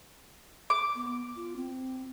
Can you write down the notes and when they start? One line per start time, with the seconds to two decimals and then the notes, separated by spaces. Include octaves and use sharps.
0.70 D6
0.95 B3
1.36 F4
1.56 C4